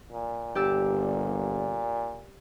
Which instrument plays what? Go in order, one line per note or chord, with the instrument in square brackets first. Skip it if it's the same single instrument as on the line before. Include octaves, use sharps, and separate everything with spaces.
[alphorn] A#2
[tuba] G1 [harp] G4 D5 E6